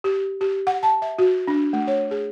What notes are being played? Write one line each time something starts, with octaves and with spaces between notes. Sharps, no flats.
G4
G4
F#5
A5
E5
F#4
D4
A3
C#5
G#4